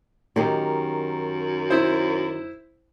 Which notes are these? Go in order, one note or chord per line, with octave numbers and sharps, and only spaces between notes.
F#2 D#3 D#4 G4
E4 C5